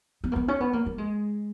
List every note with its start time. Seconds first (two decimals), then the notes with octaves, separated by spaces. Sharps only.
0.24 B3
0.32 A#3
0.36 B3
0.48 C#4
0.61 B3
0.73 A#3
0.86 A#3
0.98 G#3